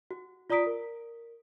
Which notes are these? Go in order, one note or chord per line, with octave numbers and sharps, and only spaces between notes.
F#4
F4 D5 A#5 D#6 B6 D7
A#4